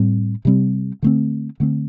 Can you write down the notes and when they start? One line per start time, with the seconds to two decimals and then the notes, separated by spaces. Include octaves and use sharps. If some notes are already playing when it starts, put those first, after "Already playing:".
Already playing: A2 G3 C4
0.45 C3 G3 C4
1.02 D3 A3 C4
1.60 D3 A3 C4